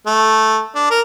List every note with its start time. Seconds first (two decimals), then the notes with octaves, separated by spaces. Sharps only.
0.06 A3
0.75 D4
0.90 A#4